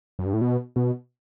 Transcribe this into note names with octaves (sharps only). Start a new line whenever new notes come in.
F#2
G2
A2
B2
B2